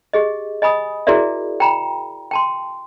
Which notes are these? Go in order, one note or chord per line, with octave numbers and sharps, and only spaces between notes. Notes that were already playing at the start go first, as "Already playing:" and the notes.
G4 G#4 D#5
D#5 G#5 B5 D#6
E4 F#4 G#4 A#4 D5 E5
G5 A#5 B5
G5 A5 C6